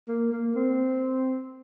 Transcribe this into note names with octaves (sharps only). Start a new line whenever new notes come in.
A#3
A#3
C4